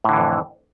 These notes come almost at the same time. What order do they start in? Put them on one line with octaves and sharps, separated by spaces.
A2 D3 E3 F2